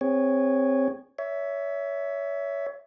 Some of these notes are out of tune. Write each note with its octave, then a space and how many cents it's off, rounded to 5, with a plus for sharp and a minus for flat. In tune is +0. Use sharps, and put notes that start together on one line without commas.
C4 +0 G#4 -30 C#5 +0
C#5 +25 E5 +0